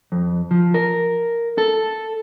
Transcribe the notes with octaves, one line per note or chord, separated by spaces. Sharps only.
F2
F3
A#4
A4